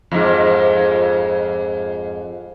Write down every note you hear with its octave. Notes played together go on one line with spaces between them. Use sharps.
F2 G#2